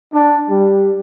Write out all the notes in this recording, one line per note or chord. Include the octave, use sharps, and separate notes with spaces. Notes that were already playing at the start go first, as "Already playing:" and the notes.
D4
G3